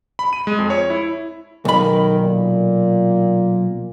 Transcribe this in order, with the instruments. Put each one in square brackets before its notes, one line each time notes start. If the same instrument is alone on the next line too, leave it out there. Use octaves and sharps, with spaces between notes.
[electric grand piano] B5
D#7
G#3
F2
C#5
E4
[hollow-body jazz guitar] B1 B5 [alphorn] D#3
[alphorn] A#2